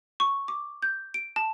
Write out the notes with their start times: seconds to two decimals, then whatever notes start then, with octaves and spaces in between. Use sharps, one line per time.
0.20 C#6
0.48 D6
0.82 G6
1.14 D7
1.36 A5